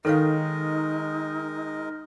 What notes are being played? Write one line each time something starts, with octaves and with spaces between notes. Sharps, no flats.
D#3 G#3 D#4 A4 A#4 C#5 D#5 F5